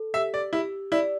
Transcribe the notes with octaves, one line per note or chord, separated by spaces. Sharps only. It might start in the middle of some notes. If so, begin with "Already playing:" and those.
Already playing: A4
G4 E5
D5
E4 G4
E4 D5